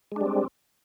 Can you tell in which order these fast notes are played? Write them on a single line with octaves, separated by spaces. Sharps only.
G#3 D4 G3 C4